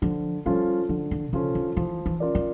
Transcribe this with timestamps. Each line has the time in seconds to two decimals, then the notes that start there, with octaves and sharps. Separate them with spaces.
0.02 D3 F3
0.46 F3 G3 C#4 F4 A4
0.89 D3 F3
1.11 E3
1.28 A#2
1.33 C#3 F3 C#4 F4 A4
1.55 D3
1.77 E3 F3
2.06 E3
2.20 C#4 F4 A#4 D5
2.35 F3